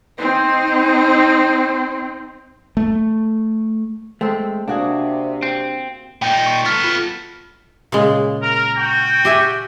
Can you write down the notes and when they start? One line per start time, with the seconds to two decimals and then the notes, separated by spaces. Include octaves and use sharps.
0.18 C4 D#4
2.77 A3
4.21 G#3 A3 C4 A4
4.68 C3 A#3 D4 F#4 G#4
5.43 C4
6.22 A#2 D#4 G5
6.46 C#6
6.66 B3 A4 F6 A6 B6
6.84 F4
7.92 A#2 C#3 G#3
8.42 A#4
8.77 F#4 G5
9.25 G4 E5 G#5